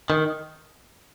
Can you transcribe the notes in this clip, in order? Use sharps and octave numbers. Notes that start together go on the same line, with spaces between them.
D#3